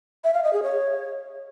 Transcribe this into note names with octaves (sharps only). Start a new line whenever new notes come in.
E5
F5
D#5
G#4
C#5